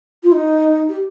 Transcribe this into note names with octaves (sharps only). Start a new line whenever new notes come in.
F4
D#4
G4